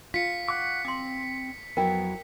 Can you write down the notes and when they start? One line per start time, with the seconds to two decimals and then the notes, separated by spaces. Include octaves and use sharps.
0.14 F4 B6 C#7
0.48 F#5 C#6 D6
0.85 C4 C6 D6
1.77 F2 F#3 B3 E4 A#4 G5